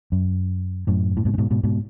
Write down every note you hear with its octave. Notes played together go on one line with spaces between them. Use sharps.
F#2
F#2 A2
A2
G#2 B2
C#3
G#2 B2
G#2 B2
G#2 B2